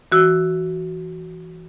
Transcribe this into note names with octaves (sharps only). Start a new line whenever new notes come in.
E3 F#4 E6